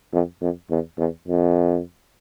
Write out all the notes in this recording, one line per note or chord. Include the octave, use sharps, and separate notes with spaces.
F2
F2
E2
E2
F2